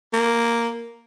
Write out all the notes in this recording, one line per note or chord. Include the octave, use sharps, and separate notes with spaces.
A#3